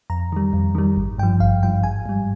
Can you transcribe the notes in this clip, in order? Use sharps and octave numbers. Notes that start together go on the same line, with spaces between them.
F2 A#5
D#3 G3
F2
D#3 G3
G#1
G2 F3 G5
G#1 F5
G2 F3 G5
G#1 G#5
G#2 G3